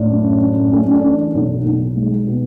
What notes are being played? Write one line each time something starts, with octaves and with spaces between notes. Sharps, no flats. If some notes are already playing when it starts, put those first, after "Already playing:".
Already playing: A2 D4
F#2
F#2
A3 C#4
C#4
D4
E3
B1
B1
G#3
B2